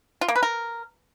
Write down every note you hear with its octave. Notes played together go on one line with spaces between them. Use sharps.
F4
A#3
B4
A#4